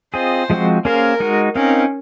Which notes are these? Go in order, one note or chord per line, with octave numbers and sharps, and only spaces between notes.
C4 F4 G#4 C5 D#5
F3 G#3 C4 F#4
A#3 C#4 G#4 A#4 C5 F5
G#3 D#4 F#4
C4 C#4 D#4 A#4 F5